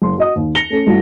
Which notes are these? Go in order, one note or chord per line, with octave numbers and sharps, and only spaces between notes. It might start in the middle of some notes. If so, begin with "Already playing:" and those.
F#1 C6
F#4 D#5 D#6
D#2
A#6 C#7 F7 G7
A3 C#4 A4
G2 E3 A3 F4 F#4